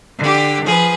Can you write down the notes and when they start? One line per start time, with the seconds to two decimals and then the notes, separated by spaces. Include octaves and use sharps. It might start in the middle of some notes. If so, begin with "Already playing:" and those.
0.18 D3 G4
0.63 F3 G#4 B4